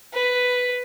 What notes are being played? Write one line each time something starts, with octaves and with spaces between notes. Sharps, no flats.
B4